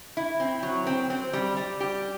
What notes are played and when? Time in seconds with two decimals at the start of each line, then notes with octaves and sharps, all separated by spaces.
0.17 E4
0.40 C4
0.63 F#3
0.87 C4
1.10 C4
1.33 G3
1.57 G3
1.80 G4